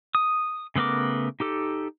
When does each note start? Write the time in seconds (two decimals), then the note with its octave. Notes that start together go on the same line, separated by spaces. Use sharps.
0.15 D#6
0.76 C#3 A3 B3 A#4 D6
1.40 D#4 G4 A4